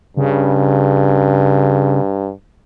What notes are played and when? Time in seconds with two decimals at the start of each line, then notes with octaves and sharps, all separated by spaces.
0.17 G2 C#3